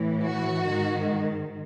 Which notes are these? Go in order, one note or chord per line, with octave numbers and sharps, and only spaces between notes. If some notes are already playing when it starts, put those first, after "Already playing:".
Already playing: A2 E3
F#4
G#2 D#3